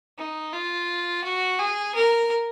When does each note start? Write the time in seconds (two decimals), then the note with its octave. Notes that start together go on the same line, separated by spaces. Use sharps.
0.18 D#4
0.53 F4
1.24 F#4
1.59 G#4
1.95 A#4